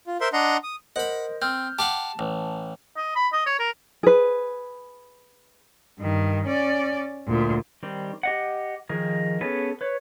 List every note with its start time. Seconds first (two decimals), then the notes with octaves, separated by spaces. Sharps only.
0.07 F4
0.21 A#4 C5 E5 C6
0.33 D4 D#5 F#5 A#5 C6
0.63 D#6
0.96 A#4 C5 D#5 F#5 B5
1.42 C4 F6 G6
1.79 G4 F5 F#5 A5
2.19 A1
2.97 D#5
3.16 B5
3.33 D#5
3.46 C#5
3.59 A#4
4.03 G#4 B4
6.00 G2 D#3
6.47 C#4 D5
7.27 D2 A#2
7.83 D#3 G3 C4
8.23 G4 D#5 F#5
8.89 D#3 F3 G#4 A#4
9.41 B3 C#4 G#4 A4 B4
9.81 B4 C#5